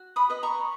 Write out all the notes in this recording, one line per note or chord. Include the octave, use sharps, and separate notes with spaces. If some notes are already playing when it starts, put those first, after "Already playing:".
Already playing: F#4
B5 D#6
B4 D#5
A#5 C#6